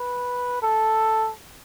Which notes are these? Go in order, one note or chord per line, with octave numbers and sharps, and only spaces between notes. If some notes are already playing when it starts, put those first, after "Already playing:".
Already playing: B4
A4